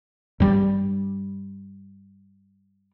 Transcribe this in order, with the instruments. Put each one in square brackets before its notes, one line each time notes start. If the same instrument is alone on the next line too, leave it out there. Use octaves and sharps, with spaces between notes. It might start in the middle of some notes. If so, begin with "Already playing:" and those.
[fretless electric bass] G2 G3